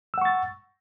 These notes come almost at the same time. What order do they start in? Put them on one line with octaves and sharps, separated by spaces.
E6 F#5 C#6 A6